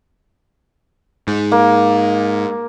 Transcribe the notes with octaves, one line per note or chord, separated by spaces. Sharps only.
G#2
A#3